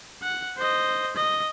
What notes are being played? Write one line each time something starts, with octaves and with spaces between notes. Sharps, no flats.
F#5
C5 D#5
D#5